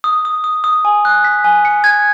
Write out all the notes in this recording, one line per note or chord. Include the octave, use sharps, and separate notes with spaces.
D#6
D#6
D#6
D#6
G#5
F#6
B6
G#5
C#7
G#6